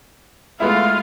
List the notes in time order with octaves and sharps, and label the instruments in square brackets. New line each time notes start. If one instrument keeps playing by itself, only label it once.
[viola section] G#3 F4 F5 [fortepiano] A3 B3 E4